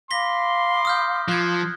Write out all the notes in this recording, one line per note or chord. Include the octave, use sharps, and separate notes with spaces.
F5 B5 C6 D6 A#6 B6 G7
D#6 F6 G6
F3 F#6 G#6